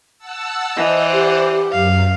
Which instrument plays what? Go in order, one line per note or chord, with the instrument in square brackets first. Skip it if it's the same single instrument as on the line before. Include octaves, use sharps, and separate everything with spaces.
[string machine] F#5 A5 E6
[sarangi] E3 [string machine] C5 D5 F#5 [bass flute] D#5
[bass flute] G4
[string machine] F#2 [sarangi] F5